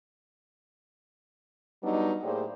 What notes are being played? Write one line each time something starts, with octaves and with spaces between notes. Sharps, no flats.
F#3 G3 B3 D4 D#4
A2 A#3 G4 G#4 C5 D5